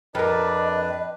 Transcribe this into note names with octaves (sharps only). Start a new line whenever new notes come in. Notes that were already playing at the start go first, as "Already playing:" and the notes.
F2 D4 A#4 B4 D#5